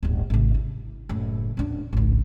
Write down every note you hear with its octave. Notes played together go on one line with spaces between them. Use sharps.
D1 G1
G#1 C3
E4
F#1 A2
D#1 D4
G#1 C#2